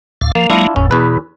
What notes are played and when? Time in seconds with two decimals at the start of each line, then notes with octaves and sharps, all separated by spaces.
0.21 D2 A2 F5
0.35 F3 A#3
0.50 F#3 G#3 A#3 D4 E4 F4
0.76 F#1 E2 A2 C#4
0.91 E2 B2 B4